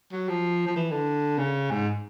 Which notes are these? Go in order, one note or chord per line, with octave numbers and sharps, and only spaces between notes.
F#3
F3
F3
E3
D3
C#3
G#2